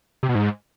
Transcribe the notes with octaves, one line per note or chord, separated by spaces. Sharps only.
C3
B2
G#2